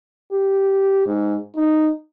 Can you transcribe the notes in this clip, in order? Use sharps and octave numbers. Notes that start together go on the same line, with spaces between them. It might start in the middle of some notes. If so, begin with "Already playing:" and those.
G4
G#2
D#4